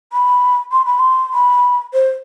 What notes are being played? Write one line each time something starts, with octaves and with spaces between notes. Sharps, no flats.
B5
C6
B5
C6
B5
C5